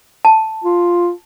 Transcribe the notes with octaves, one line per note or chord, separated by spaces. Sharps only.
A5
F4